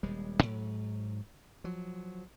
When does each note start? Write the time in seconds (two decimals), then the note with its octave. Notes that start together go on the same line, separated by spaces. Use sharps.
0.03 D#1 G3 G#3
0.43 G#2 F#3
1.64 F3 F#3